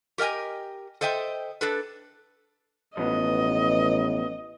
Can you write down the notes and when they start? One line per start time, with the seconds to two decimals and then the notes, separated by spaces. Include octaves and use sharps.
0.18 G4 A#4 D#5 G5 G#5
1.01 A4 C5 D#5 E5 G5
1.61 D4 A4 B4
2.97 A1 F2 B2 B3 D#5